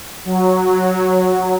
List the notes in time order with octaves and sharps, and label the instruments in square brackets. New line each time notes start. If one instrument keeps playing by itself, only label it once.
[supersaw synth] F#3